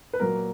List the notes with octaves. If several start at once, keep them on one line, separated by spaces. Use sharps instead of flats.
B4
A#2 F#3 A#3 A#4